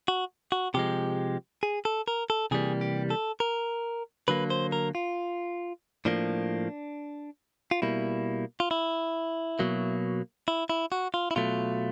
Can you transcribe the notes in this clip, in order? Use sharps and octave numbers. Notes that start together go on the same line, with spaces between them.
F#4
F#4
C3 F3 G#3 G4
G#4
A4
A#4
A4
C3 E3 G3 A#3 G#4
G4
A4
A#4
D3 F#3 A#3 B4
C5
A#4
F4
A2 F3 A#3 D4
F4
B2 G3 A#3 E4
F4
E4
B2 F#3 A#3
E4
E4
F#4
F4
E4
B2 F#3 A3 F4